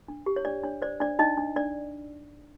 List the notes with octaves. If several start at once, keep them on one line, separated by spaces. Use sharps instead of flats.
D4
G4
C#5
D4 D5
D4 C#5
C5 D5
D4 D5
D4 D#4 D#5
D4
D4 D5